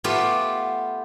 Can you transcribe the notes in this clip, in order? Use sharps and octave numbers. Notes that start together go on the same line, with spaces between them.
A3 B3 F4 G4